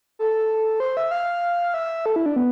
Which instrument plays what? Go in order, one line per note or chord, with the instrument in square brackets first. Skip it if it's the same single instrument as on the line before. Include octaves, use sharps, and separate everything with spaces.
[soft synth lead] A4
C5
E5
F5
E5
A4
E4
D4
B3